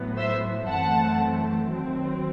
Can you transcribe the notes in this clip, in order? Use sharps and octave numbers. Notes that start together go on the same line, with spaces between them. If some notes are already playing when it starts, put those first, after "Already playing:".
Already playing: A2 F#3 B3
C5 E5
F#2 E3 A3 C4 F#5 A5
D#2 D#3 F#3 C4